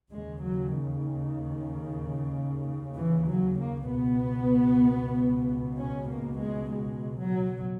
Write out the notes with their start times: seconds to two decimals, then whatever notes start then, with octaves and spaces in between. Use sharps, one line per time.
0.12 D#2 C#3 G#3
0.43 F#3
0.75 D#3
2.94 E3
3.26 F#3
3.57 A#3
3.88 C#2 B2 B3
5.76 C#4
6.08 A#3
6.39 G#3
6.70 G#3
7.18 F#3